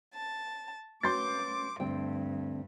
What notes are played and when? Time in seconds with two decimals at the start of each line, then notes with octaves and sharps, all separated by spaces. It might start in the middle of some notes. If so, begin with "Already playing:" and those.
0.14 A5
1.03 C#4 F#4 B4 C6 D6 G6 A6
1.80 D2 G2 C4 G5